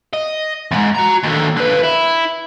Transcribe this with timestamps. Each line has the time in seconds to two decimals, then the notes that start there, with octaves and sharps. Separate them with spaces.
0.13 D#5
0.71 E2 G#2
0.95 F#4 A#5
1.24 D#2 D3
1.57 D3 B4
1.83 E4